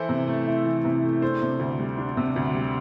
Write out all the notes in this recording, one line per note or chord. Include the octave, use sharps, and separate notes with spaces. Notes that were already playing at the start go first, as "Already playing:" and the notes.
Already playing: E3 E4 A4 C5
C3
A3
E4
E3
C3
A3
D4 A4 C5
C3
D2
G3
D4
C3
D2
G3